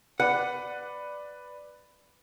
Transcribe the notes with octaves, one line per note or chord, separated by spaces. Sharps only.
B4 D5 F#5